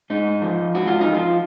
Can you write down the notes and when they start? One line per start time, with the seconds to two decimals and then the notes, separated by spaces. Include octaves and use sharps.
0.10 G#2 D#4
0.42 F3
0.74 G#2 F#4
0.87 F4
1.01 D#4
1.07 F3
1.14 F4